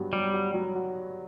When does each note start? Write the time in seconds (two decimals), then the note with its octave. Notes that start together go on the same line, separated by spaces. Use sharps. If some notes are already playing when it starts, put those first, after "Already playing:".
Already playing: G2 F#3 B3 F#4
0.12 F#3 G3
0.34 F#4
0.54 F#3
0.75 F#4